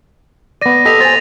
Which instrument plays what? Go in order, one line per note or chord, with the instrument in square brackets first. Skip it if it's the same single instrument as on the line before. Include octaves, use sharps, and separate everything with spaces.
[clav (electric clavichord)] B3 D5 [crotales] A#6 D#7
[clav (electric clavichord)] G4 A4 D#5 [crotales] A#6 B6 F7
[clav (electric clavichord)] C5 G#5 [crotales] A6 F7